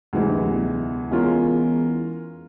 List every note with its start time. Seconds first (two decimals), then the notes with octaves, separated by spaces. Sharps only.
0.13 D2 G#2 C3 E3 G#3
0.25 G2
0.37 F#2
0.49 E2
1.11 E2 G#3 C#4 F4 A#4